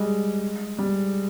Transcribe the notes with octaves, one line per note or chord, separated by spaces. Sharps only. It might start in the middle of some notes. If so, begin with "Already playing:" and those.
Already playing: G3 G#3
G3